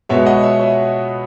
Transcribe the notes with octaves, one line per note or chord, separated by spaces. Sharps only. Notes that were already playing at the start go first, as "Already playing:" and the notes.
B2 G#3 B3 C#5 E5
D#5 F#5
C#5 E5
C#5 E5